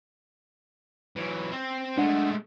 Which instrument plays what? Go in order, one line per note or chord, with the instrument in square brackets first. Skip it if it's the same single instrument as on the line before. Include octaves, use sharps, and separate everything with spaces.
[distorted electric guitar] E3 F#3
C4
[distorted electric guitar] G#3 A3 [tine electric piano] D4 F#5